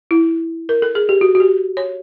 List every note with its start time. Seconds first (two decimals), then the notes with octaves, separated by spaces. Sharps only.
0.11 E4
0.69 A#4
0.82 A4
0.95 G#4
1.09 G4
1.21 F#4
1.35 F#4
1.40 G4
1.77 C#5